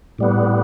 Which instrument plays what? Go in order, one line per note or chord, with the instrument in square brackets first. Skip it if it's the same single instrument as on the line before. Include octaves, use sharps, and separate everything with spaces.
[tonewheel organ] A2 G3 B3